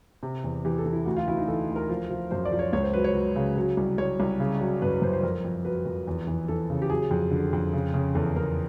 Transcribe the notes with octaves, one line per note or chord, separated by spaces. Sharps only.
C3
E2
E3 G4
A4
E3
E4
D2 F#4
F4
E3 E4
D#4
E3 A4
D2
A#4
F3
F3
F#2 C5
D5
F3
C#5
C#2 C#5
C5
F#3 B4
C#5
F#3
C#3
F#3
C2
C2 C#5
C2
C#3
F#3
F#2 B4
B4
F#2 C5
C5
F2 A#4
F2
F#3 B4
F2
E2
E3
E3 A4
C#3
G4
F#3 G#4
F2
D3
F2
C#3
C#3
E2 A4
E2 A#4